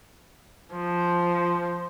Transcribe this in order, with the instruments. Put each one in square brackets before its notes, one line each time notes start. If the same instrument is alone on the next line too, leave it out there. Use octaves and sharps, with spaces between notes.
[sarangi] F3 [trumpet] C5